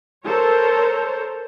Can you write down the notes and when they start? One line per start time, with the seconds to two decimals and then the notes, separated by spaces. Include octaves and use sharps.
0.25 A4 A#4 C5 C#5